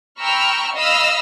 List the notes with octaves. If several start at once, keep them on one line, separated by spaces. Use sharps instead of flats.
G5 A#5 B5 C#6 E6 F6
D#5 F5 B5 E6 F6